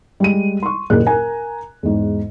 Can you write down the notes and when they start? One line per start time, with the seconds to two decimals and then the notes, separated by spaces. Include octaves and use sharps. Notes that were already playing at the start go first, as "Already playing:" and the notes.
0.20 G3 G#3 D#7
0.63 C6 C#6
0.90 F#1 D#2 A#2 G#4 A#4 F#6
1.07 A#4 G#5 A#5
1.83 E2 G#2